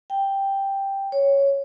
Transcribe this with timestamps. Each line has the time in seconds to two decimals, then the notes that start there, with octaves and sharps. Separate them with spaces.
0.10 G5
1.12 C#5